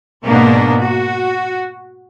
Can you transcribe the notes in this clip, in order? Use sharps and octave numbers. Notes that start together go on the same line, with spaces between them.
G#2 B2 A#3 B3 D4
F#4